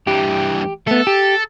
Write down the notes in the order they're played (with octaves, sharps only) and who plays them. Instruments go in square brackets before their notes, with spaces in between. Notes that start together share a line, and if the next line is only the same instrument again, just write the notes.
[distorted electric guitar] G2 E3 [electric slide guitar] G4
[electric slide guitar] A3 B3 [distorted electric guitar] A4
[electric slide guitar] G4